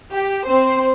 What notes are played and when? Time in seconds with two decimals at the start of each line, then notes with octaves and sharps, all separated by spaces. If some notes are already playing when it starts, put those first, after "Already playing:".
0.12 G4
0.46 C4 C5